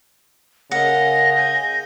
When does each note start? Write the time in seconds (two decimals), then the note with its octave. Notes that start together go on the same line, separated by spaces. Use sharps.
0.71 C#3 A#4 D#5 F#5 A#6
1.34 G5 G#5